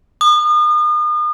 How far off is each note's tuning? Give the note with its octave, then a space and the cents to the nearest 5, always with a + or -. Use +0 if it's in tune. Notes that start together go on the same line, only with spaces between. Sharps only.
D#6 -40